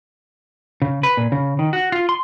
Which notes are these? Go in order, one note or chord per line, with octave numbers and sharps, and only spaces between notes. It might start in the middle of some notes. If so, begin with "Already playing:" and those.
C#3
B4
A#2
C#3
D#3
F#4
F4
C6